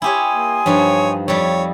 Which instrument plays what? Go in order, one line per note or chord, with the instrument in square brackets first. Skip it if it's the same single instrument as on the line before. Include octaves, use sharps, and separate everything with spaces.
[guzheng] E4 G4 C#5 [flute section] G#5 C6 D#6
[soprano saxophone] A#3
[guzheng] G2 F3 D#4 [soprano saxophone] C#5
[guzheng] F2 G3 [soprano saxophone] C#5